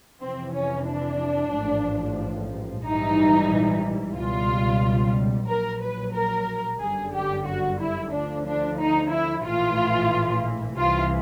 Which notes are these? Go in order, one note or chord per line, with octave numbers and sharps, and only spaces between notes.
F2 C3 E3 C4
C#4
D4
A1 G#2 F3
A#1 G#2 E3 G3 D#4
C#2 B2 G3 F4
A#1 A#2 F#3 A#4
B4
A#4
G1 F#2 D3 G3 G#4
G4
F#4
E4
D2 D3 F3 D4
D4
D#4
E4
A#1 A2 E3 F4
C2 C3 E3 F4